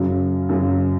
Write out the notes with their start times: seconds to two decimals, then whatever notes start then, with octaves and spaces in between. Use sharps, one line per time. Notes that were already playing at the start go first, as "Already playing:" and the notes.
Already playing: F#2 C#3 F#3
0.49 F#2 C#3 F#3